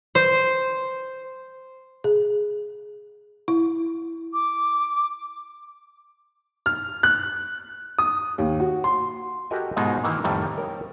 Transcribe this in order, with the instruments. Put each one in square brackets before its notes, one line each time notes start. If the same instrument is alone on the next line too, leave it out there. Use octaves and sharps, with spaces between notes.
[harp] C5
[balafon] G#4
E4
[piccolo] D6
[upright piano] F6
F#6
D#6
D#2
F#4
C6
[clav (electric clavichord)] F#4 G4 A4 A#4 D#5 G#5
G#2 B2 G#3 D#4 F4
D#3 E3 A#3
F2 A2 D#3 G3
A#4 C#5 G5